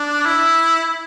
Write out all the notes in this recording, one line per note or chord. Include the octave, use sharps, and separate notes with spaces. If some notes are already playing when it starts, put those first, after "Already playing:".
Already playing: D4
E4